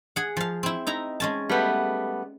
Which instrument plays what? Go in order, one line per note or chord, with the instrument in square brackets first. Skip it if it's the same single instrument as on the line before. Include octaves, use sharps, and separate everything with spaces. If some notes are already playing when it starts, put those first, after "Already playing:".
[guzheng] G#4 F#5
F3 F5
C4 E4
D#4 E4 A#5
G#3 C#4 A5
[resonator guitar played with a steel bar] G3 A3 B3